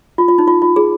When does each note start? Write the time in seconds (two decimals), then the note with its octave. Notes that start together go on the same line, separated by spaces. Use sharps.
0.18 F4
0.28 F4
0.38 D#4
0.48 F4
0.62 F4
0.76 G#4